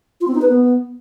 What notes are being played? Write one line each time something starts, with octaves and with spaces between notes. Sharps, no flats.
F4
C4
D#4
B4
B3